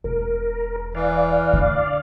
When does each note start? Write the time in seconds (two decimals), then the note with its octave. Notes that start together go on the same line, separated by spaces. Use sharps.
0.04 E1 A#4
0.95 E3 D5 F5
1.53 D3